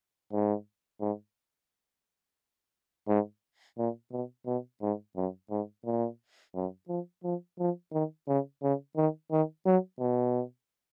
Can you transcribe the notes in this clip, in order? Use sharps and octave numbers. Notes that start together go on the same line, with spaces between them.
G#2
G#2
G#2
A#2
B2
B2
G#2
F#2
G#2
A#2
F#2
F3
F3
F3
D#3
C#3
C#3
D#3
D#3
F#3
B2